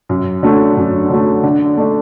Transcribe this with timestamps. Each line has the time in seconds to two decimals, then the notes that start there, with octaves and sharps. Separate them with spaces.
0.09 F#2
0.43 D3 F#3 A3
0.77 F#2
1.10 D3 F#3 A3
1.44 D3
1.77 A3 D4